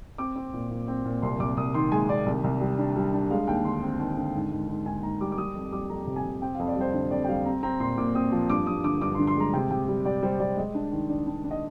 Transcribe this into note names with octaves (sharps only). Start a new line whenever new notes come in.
C4 D6
C4
A#2
A#2
C4
A#2
C2 C6
C2 D6
C2 D#6
D#3 C6
G#3 G#5
D#3 D5
C2
C2
G3
D4
G3
D4
G#3 F5
D#2 G5
D3 C6
C4
D#2
D3
G#2
G#2
G#2
G#2 G#5
G#2 A#5
G3 D6
D6
G3 D#6
F2
G3 D6
F2 A#5
C3
G#5
C3
C4 G5
F5
F2
D5
G3 C5
D3
F2 D5
G5
G3 F5
C4 A#5
C4 A#5
A#2 C6
A#2 D6
C4 D#6
F3
G2 D6
G2 D#6
D3 D6
G2 D6
C6
D3
C6
G#3 A#5
C3 G5
C3 G5
G3
G3 D5
G3 C5
G3 D5
G#3 D#5
D4
D#3
D4
D4
D4
D#5